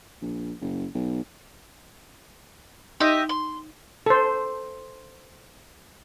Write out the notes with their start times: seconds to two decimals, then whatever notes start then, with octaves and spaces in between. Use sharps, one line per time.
0.21 A#1
0.61 F#1
0.94 B1
3.00 D#4 G4 D#5 E5
3.29 C6
4.06 A4 C5